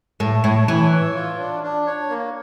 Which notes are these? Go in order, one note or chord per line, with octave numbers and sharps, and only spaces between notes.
A2 A3
A2 C#5
E3 C#5
C#5
F4
D4
D4
C#5
A#3